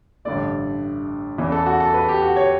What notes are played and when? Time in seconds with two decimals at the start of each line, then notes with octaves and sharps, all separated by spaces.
0.25 A1 G2 D3 A3 D5
1.38 E2 C#3 E3
1.52 A4
1.66 F#4
1.80 A4
1.94 B4
2.08 G4
2.22 F#4
2.36 C#5